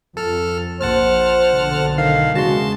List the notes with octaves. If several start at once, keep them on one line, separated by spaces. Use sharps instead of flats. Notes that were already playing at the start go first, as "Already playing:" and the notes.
F2 A4 F6
A#1 C5 F#5 A5 F6
B1 D3
D#3 F5
E2 C#3 G#3 F#4 A5 C6